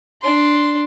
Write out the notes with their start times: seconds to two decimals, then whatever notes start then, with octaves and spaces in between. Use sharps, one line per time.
0.22 D4 C6